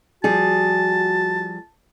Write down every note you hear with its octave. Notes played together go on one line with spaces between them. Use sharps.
F3 G3 F#4 G#4 A5